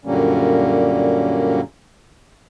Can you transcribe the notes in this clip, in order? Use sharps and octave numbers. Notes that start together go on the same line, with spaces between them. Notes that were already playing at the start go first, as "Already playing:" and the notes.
F#2 A#2 D3 G3 A#3 C#4